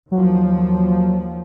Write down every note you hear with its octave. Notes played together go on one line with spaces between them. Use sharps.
D#2 F3 F#3